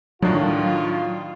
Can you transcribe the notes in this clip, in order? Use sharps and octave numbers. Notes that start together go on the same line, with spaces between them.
A2 D#3 F#3 D4 F4